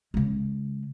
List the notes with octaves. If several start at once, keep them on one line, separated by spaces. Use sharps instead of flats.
C#3 G#3